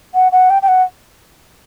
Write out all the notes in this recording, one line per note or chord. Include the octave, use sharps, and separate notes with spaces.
F#5
F#5
G5
G5
F#5